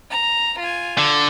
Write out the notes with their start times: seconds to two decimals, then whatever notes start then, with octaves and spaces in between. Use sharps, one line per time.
0.10 A#5
0.60 F4 G#5
0.98 D3